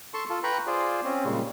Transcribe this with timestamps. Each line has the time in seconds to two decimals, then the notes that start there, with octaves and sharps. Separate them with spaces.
0.14 A4 A5 C6 C#6
0.30 F4 A4
0.43 B4 G5 A#5 B5 C#6
0.67 F4 G#4 C5 D5
1.04 C4 C#4
1.24 A#2 C#3 G3 G#3